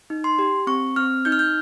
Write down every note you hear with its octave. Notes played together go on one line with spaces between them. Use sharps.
D#4
C6
G4
C4 C#6
C4 F6
D#4 G6
F6
G6